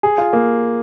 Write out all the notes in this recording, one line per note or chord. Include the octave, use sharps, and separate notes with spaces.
G#4
F4
A#3